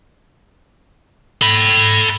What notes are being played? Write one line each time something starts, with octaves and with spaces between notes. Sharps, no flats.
A4 B5